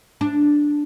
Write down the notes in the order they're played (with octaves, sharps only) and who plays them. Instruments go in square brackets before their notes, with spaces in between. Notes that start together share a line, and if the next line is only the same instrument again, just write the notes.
[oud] D4